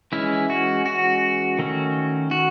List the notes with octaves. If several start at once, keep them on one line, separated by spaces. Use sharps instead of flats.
E3 G#3 C#4 E4
F#4
F#4
D#3 A3 C#4
F#4